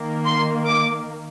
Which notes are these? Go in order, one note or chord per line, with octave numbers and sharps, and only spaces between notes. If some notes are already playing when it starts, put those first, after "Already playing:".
Already playing: D#3 A#3
C6
D6